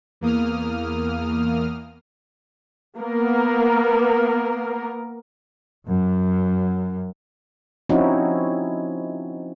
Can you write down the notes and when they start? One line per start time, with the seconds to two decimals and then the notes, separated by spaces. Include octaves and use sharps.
0.21 E2 A#3 D#6 F6
2.99 A#3 B3 A#4
5.87 F#2
7.89 F3 C4 C#4 D#4 E4 F#4